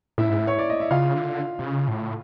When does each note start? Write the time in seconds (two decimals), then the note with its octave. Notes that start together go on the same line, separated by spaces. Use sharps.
0.18 A2 E4 E5
0.29 G#2
0.40 A2
0.47 C#5
0.59 D5
0.70 D#5
0.80 E5
0.91 C#3 F4 F5
1.15 D3
1.59 C3
1.64 C#3
1.88 A2